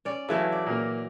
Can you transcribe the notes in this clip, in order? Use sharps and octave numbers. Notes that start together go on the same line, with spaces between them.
C#4 D5
C#3 E3 F#3 A3
D5
A#2 A#3